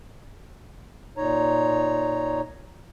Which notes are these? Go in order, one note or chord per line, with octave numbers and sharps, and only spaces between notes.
A#2 D#4 C#5 A#5